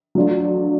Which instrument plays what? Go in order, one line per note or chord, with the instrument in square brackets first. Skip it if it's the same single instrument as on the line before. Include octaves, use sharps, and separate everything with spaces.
[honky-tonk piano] F#3 A3 D4 F4